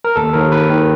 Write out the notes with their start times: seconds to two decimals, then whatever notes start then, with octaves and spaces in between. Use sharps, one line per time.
0.05 A#4
0.16 D#2 A4
0.33 D#2 A#4
0.52 D#3 B4
0.69 D#3